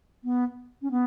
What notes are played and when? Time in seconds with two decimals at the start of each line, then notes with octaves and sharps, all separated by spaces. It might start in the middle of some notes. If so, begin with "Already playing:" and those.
0.24 B3
0.82 C#4
0.91 B3